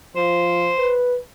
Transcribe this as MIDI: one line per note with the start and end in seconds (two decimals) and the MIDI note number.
0.16 0.70 53
0.16 0.94 72
0.78 1.17 71